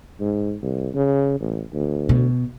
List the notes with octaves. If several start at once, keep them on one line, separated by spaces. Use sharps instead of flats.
G#2
C2
C#3
A1
D2
B2